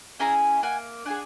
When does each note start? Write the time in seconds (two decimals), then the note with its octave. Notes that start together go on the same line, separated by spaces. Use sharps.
0.19 C#4 E4 G#4 G#5 A#5
0.63 A#3 F#5 G#5
1.05 D4 F4 G#4 F#5 G#5